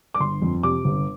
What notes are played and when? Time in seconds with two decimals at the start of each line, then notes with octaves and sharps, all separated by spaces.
0.14 D6
0.20 G1 C6
0.42 F2
0.63 C3 D6
0.85 G1